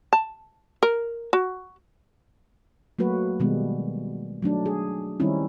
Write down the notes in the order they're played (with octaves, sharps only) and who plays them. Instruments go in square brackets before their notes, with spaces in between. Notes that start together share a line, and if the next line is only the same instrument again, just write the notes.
[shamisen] A5
A#4
F#4
[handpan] F#3 A3 A#3 F#4 B4
B2 D#3 G3 G#3 B3
F#3 A3 D4 D#4
G#4
D#3 G3 C4 C#4 D#4 E4